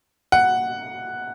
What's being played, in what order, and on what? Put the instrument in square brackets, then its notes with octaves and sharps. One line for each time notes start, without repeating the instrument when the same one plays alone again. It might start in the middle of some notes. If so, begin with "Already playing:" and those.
[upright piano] F#5